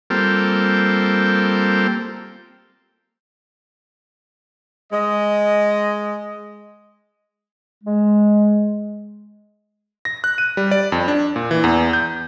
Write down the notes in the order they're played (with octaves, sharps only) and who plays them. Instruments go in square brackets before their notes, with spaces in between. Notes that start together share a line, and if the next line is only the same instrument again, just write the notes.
[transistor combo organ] G3 A#3 C4 F4 A4 G5
[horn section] G#3 D#5
[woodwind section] G#3
[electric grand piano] A#6
F#6
D#7
G3
D5
F2
D4
A#2
E3
E2
G6